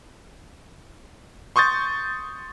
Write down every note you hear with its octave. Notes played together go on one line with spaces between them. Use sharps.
C6 C#6 D#6 G6 A6